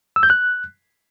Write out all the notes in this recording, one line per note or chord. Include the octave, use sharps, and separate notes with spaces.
E6
G6
F#6